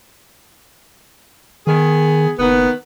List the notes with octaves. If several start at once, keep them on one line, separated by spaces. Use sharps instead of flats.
D#3 B3 G#4
F#1 D#3 B3